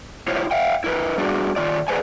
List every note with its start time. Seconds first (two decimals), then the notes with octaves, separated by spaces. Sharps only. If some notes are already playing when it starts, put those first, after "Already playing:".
0.28 E4 F4 G4 C5 C#5
0.51 E5 F5 G5
0.84 E4 A#4 B4
1.18 G3 D4 F#4 G#4
1.56 D#3 F4 D5
1.88 G#4 B4 C5 D5 G#5